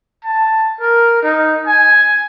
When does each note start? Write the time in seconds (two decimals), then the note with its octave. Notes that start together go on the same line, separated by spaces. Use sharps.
0.24 A5
0.80 A#4
1.22 D#4
1.67 G#5